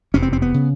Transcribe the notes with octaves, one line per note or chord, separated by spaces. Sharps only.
F1 E2 C3 C#4
C4
C4
B3
C#3